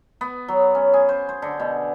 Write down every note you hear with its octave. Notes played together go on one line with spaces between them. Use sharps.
B3
F#3
C#4
G#4
C5
C5
D3
B2